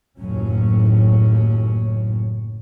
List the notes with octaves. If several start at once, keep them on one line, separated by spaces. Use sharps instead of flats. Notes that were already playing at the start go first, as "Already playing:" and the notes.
F#1 D#2 A2 F#3 C#4